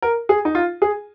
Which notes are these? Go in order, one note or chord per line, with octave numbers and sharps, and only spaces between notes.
A#4
G#4
D#4
F4
G#4